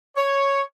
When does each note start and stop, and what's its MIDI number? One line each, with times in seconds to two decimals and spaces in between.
0.16 0.61 73